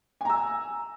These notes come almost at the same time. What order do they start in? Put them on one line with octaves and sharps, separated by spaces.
G#5 A#5 E6